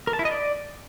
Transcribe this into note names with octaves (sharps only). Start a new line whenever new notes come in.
A#4
A5
E4
D#5
D5